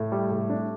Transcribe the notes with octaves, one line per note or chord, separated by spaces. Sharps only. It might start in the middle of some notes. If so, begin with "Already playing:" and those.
Already playing: A2
G3
A2
D4